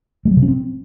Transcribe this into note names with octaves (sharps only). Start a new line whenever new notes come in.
G#3
F#3
C3
C#4
C4